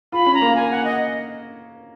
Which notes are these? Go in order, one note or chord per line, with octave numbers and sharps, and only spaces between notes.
F4 B5
C#4
A#5
A#3
G#5
F#5
D#5